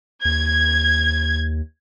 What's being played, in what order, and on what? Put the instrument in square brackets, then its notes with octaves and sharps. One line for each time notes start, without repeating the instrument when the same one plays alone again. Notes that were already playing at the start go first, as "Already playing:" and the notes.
[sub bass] D#2 [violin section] G#6